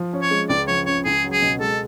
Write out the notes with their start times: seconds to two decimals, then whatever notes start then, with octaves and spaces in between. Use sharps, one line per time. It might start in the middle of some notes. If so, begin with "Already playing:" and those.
Already playing: F3
0.13 C#4
0.22 C#5
0.31 G#3
0.49 C#2 D5
0.68 F3 C#5
0.86 C#3 C#5
1.05 C#2 G#4
1.24 F#3
1.33 G#4
1.42 B2
1.60 G#3 A4